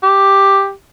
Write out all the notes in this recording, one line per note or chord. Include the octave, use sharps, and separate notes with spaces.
G4